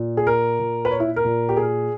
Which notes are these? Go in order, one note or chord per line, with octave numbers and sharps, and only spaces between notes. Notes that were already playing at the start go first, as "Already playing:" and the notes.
Already playing: A#2
G#4
A#4
A#2
B4
C#5
E4
A#4
A#2
G4
G#4